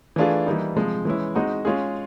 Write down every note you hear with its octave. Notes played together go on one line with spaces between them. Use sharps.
E3 A3 D4 F4 G#4
E3 G3 A#3 D#4
C3 F3 G#3
E3 G#3 C#4 E4
G#3 C4 D#4 F#4
G#3 C#4 F4 G#4